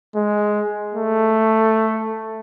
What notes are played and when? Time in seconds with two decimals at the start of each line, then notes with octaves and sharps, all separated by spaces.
0.15 G#3
0.95 A3